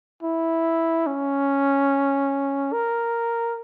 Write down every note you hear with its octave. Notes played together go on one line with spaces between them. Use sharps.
E4
C#4
A#4